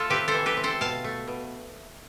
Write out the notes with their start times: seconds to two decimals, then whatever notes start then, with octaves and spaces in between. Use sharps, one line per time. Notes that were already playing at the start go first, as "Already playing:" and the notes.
Already playing: A3 F4 A4
0.10 C4 G4 B4
0.28 A4 C5
0.34 E3
0.46 G4 B4
0.57 C4
0.64 A4 C5
0.81 B2 F5 A5
1.04 A3
1.27 B2